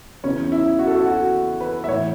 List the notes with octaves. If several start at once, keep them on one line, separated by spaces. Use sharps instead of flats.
E2 C#3 E3 C#4
E4
F#4
A4
F#4
F#4
B4
E5
A2 E3 C#5